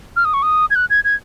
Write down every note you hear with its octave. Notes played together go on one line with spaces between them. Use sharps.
F6
D#6
C#6
D#6
G#6
F#6
G#6
G#6